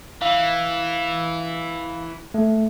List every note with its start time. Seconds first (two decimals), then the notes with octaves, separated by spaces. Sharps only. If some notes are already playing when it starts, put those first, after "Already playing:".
0.22 E3 F5
2.34 A3